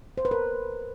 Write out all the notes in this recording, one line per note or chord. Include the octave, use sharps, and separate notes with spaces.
C5
B4
A#4